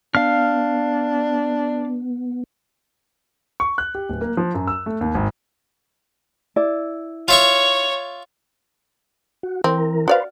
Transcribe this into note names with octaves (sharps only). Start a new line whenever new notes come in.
B3 D4 F5 F6
C#6
F#6
G4
D1
A#3
F3
F#2
E6
A3
D#2
G#1
E4 D5
F4 C#5 E5 C#6
F#4
E3 C4 A#4
F#4 B4 C5 D5 F5